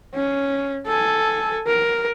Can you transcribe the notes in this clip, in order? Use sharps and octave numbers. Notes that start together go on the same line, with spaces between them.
C#4
A4 G#5
A#4